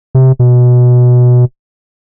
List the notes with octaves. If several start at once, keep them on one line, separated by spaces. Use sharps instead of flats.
C3
B2